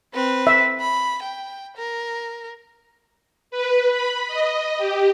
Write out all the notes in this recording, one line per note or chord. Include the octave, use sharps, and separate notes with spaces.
C4 B4
E5
B5
G5
A#4
B4
B5
D#5
G4